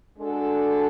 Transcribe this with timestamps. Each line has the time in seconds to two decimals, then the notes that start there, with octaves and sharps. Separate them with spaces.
0.18 G#3 D4 F#4 A4